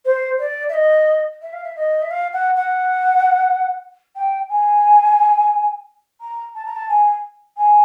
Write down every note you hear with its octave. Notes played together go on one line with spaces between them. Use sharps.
C5
D5
E5
D#5
E5
F5
E5
D#5
E5
F5
F#5
F#5
G5
G#5
A#5
A5
A#5
A5
G#5
G#5